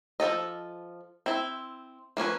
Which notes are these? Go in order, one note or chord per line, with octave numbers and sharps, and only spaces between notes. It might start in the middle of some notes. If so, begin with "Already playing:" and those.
F3 C4 A4 D#5
C4 E4
F3 A#3 C#4 B4